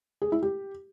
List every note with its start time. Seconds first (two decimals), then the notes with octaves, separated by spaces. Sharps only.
0.22 G#4
0.32 E4
0.43 G4